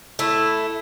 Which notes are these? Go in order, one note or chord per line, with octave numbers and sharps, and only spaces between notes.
A3 E4